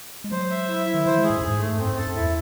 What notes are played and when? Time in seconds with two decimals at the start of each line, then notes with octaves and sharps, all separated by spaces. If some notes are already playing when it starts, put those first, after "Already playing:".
0.24 G#3
0.32 F#3 C5
0.51 E5
0.68 E4
0.86 E4
0.94 D#3
1.06 E3 C5
1.18 G#3
1.23 G#4
1.30 A2
1.37 F#2
1.42 G#2 G#4
1.60 A3
1.79 F#2 C4
1.86 G#2
1.93 F#2
1.97 G#2 A4
2.07 F#2
2.15 E2 E4